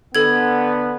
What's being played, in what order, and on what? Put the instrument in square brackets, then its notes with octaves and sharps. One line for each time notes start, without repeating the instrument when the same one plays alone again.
[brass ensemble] D3 B3 [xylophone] A4 G#6